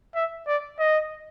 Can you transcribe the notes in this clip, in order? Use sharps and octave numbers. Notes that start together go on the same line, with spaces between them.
E5
D5
D#5